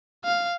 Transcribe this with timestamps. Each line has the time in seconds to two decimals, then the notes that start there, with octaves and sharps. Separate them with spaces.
0.24 F5